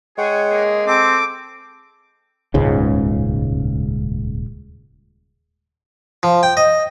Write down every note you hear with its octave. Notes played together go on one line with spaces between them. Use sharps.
G#3 G#4 C#5 F#5 G5
A#3 G#4
C4 A4 D6
D#1 C#2 G#2 C#3
F3
G5
D#5